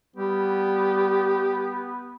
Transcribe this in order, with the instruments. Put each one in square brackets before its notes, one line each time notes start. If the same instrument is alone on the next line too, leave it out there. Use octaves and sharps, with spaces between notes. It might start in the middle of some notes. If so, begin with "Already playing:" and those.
[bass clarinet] G3 [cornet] B3 [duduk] G4